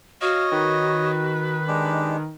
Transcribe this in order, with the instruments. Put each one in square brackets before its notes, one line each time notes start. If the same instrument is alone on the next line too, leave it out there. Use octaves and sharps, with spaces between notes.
[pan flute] F#4 [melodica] C#5 D#5 [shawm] F5
[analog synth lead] D#3 [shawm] B4
[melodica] G#3 D4 G4